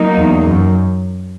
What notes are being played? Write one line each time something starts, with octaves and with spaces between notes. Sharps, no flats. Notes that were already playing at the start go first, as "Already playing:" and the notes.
Already playing: F#3 A#3 D#4
E2
F#2